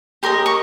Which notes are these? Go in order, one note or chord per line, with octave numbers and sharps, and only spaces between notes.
G4 A#4 D#5 C6
C#6